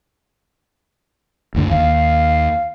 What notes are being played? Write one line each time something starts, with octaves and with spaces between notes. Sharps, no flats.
F#1 D2 D3
D#2 F5